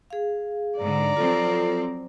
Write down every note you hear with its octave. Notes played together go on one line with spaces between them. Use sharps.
G#4 F5
G#2 D3 D5 A#5
F3 F#3 C4 F4 A4